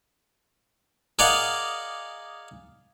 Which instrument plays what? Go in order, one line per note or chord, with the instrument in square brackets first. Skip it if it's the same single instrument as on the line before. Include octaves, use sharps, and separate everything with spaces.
[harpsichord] G#4 A#4 D5 D#5 F5 F#5